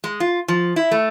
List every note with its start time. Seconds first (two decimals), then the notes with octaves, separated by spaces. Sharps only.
0.04 G#3
0.20 F4
0.48 F3
0.76 E4
0.91 A3